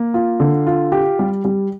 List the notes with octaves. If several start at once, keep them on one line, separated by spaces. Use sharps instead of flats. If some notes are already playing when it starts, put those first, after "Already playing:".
Already playing: A#3
F4
D3
F4
G4
G3
G3